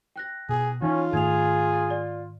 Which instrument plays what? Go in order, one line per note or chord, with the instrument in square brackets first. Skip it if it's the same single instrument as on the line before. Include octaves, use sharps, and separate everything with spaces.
[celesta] G5 F#6 A#6
[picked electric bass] B2 [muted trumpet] G#4
[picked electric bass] E3 [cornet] C#4 [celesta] D#4 C#5 [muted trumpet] F4
[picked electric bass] G#2 D#3 A3 [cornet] G#4 [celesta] G#6 F7
[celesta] D5